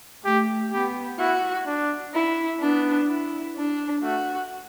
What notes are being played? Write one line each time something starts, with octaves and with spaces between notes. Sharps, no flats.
A3 G4
B3 G4
E4 F#4
D4
E4
B3 D4
E4
D4
A3 F#4